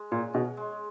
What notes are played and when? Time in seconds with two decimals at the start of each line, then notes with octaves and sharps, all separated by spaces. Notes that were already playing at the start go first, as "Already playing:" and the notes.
Already playing: G#3
0.11 A#2 C#4
0.33 B2 C#4
0.57 G#3